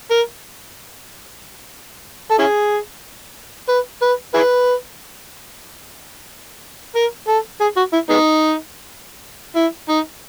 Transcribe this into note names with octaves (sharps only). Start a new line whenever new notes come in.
A#4
A4
C#4 E4 G#4
B4
B4
E4 G#4 B4
A#4
A4
G#4
F#4
E4
G#3 B3 D#4
E4
D#4